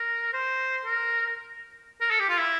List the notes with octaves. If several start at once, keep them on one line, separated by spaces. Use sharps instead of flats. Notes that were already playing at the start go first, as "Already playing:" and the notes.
Already playing: A#4
C5
A#4
A#4
A4
G4
F4
E4